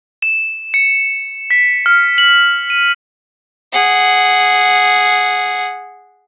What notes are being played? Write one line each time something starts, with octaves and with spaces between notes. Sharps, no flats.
E7
C#7
B6
F6
F#7
D#7
G#4 F#5